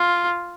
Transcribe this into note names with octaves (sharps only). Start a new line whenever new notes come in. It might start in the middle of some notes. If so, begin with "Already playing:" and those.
Already playing: F4